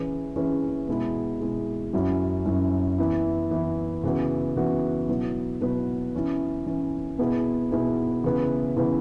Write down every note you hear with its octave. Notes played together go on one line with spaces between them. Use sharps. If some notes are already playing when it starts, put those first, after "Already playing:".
Already playing: E3 C#4 E4 G#4 B4
E3 C#4 E4 G#4 B4
B2 G#3 E4 G#4
B2 G#3 E4 G#4
F#2 F#3 C#4 E4
F#2 F#3 C#4 E4
E3 B3 E4
E3 B3 E4
C#3 E3 B3 F#4 B4
C#3 E3 B3 F#4 B4
B2 F#3 E4 B4
B2 F#3 E4 B4
E3 C#4 E4
E3 C#4 E4
B2 B3 E4 G#4
B2 B3 E4 G#4
C#3 E3 B3 E4 B4
C#3 E3 B3 E4 B4